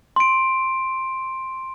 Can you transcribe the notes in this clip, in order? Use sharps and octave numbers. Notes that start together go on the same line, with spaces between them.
C6 D7